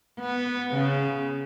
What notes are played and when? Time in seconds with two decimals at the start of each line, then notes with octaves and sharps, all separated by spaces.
0.20 B3
0.74 C#3